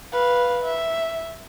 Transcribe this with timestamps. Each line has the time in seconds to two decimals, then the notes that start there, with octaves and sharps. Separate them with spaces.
0.12 B4 F5
0.64 E5